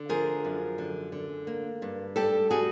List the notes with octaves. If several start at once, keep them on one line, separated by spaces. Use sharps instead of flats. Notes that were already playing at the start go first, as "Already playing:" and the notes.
Already playing: D3
F3 G#4 A#4
F#2
D3
D3
A#3
G2
G3 G4 A4
G3 F#4 G#4